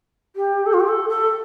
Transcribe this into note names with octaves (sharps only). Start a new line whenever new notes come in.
G4
A4
F4
G4
A4
A4